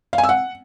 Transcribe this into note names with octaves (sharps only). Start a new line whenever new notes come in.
F5
G#5
E6
F#5